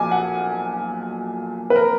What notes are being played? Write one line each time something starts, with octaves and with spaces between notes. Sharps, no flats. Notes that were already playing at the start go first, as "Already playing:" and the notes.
Already playing: B1 A#2 F3 G#5 D6
F#5
B4
A#4